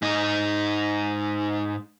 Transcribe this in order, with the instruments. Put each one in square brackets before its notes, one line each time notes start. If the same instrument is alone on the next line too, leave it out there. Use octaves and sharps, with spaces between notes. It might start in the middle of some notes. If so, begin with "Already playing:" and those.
[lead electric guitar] G#2 D#4